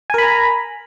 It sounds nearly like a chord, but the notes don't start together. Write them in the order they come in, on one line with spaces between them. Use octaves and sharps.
G#5 A#4 B5 A#5